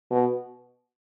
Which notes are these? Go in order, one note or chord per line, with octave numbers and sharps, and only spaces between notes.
B2